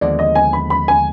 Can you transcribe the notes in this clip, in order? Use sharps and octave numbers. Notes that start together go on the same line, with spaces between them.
D#2 D3 F3 G#3 B3 D5
D#5
G#5
B5
B5
G#5